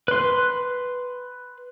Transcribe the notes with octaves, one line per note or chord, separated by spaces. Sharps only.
B4 C6